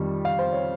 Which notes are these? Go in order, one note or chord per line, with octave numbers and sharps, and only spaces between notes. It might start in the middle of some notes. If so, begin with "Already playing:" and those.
Already playing: F2 D#3 G3
F5
C5
C#5